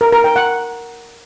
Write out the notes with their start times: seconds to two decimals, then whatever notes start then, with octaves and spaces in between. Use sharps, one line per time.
0.01 A#4
0.13 A#4
0.24 G5
0.36 F#5